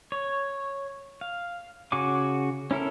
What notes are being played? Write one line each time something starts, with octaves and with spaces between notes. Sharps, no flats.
C#5
F5
C#3 F#4 G#5 D6
C#4 E4 A4 A#4